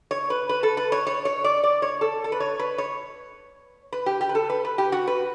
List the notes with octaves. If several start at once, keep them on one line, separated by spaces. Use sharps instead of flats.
C#5
B4
B4
A4
B4
C#5
C#5
C#5
D5
D5
C#5
A4
A4
B4
C#5
B4
C#5
B4
G4
G4
B4
A4
B4
B4
G4
F#4
B4